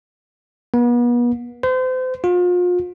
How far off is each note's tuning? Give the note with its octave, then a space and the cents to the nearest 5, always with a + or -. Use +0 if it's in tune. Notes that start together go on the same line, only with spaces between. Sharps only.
B3 -40
C5 -35
F4 +35